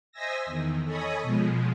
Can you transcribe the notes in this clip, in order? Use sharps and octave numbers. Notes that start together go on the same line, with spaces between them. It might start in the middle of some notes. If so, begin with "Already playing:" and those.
C5 D#5 E5 G#5 E6 A#6
E2 D#3
A4 C#5 D#5 G#5 B5 D#6
B2 F3 G#3